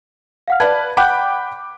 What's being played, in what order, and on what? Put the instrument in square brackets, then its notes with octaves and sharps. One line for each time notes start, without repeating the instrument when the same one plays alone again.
[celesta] F5 F#5 F6
[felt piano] B4 D5 [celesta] A5 F6 G#6
[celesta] F#5 F#6 G6 [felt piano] G5 B5 D6